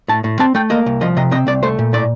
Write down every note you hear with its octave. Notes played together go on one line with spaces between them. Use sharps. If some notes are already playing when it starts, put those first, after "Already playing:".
A2 A5
A2
C4 A5
A3 G5
A#3 D#5
C2
F3 D#5
C3 D#5
C4 D#5
C2 D5
A3 C5
A#2
A2 D5